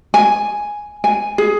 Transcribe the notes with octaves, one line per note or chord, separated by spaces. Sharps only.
G#5
G#5
G#4